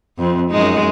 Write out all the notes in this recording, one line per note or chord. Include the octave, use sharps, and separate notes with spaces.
F2 C4
F#2 G#3 D#4